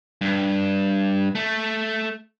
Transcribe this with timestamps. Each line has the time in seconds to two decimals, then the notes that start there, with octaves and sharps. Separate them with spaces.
0.21 G2
1.35 A3